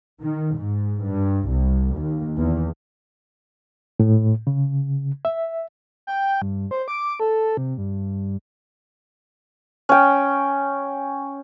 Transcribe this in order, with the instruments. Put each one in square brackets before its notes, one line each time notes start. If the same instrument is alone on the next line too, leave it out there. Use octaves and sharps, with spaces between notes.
[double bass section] D#3
G#2
G2
C2
D#2
E2
[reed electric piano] A2
C#3
E5
[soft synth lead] G5
G2
C5
D6
A4
C3
G2
[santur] C#4 G5